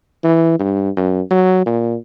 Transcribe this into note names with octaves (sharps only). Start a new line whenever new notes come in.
E3
G2
F#2
F#3
A#2